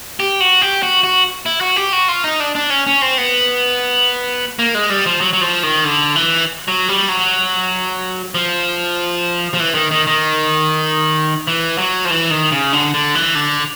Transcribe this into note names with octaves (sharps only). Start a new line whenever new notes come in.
G4
F#4
G4
F#4
F#4
E4
F#4
G4
F#4
F4
D#4
D4
D4
C#4
C#4
C4
B3
A#3
G#3
G3
F3
F#3
F#3
F3
D#3
D3
E3
F#3
G3
F#3
F3
F3
E3
D#3
D#3
D#3
E3
F#3
F3
E3
D#3
C#3
D3
D3
E3
D3